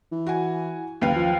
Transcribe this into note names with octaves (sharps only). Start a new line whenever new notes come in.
E3
F#4 G#5
F#1 D#2 B4 F5
F3